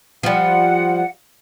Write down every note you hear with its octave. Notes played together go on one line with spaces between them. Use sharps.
F3 G3 F#5